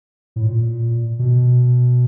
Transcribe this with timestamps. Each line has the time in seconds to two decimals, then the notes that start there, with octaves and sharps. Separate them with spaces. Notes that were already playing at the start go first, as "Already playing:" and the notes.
0.36 A2
0.44 A#2
1.19 B2